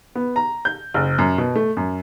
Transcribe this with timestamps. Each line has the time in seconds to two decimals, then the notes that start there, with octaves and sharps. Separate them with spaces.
0.15 B3
0.36 A#5
0.65 G6
0.94 F#1
1.18 F#2
1.38 B2
1.55 A3
1.77 F#2